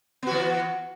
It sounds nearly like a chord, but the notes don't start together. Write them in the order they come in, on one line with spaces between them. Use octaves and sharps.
B3 F#4 E3